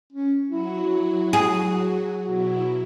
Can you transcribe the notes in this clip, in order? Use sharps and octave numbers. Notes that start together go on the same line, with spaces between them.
C#4
F#3 E4 F#4
G#4
B2 F#3 E4 F#4